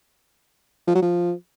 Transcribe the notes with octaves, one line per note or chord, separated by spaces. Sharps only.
F3
F#3
F3